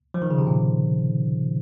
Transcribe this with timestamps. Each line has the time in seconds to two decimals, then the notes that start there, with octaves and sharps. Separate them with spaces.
0.14 F3
0.22 D#3
0.30 C#3
0.38 C3
0.47 A#2